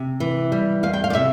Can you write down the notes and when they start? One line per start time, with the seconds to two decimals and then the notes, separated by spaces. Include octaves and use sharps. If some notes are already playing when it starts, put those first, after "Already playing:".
Already playing: C3
0.20 E3
0.52 G3
0.83 E2 F5
0.93 G5
1.04 F5
1.10 D5
1.15 C3 E5